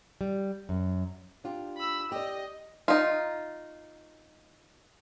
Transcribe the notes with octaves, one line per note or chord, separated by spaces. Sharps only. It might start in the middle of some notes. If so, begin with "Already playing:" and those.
G3
F#2
D4 F4 G4
B5 E6
G4 D5 D#5
D#4 F4